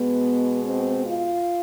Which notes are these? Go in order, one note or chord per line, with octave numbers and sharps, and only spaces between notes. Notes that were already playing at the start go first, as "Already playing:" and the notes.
Already playing: B2 G#3 B3
C4
F4